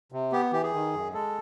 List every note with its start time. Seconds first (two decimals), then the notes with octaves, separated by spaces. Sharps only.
0.12 C3
0.32 B3 G4
0.52 E3 G4
0.63 G#4
0.73 D#3
0.93 F#2
1.13 G#3 A4